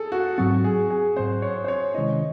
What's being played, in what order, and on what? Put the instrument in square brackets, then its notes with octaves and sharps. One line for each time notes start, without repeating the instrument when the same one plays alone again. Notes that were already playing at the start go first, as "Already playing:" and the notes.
Already playing: [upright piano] G#4 A4
F#4
[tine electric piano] G#2 F#3 C4 [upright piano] F#4
[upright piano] G#4
G#4
[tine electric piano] G#2 F#3 C4 [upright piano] C5
[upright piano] C#5
C5
C#5
[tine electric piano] C3 D#3 G#3 C#4 E4 [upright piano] D#5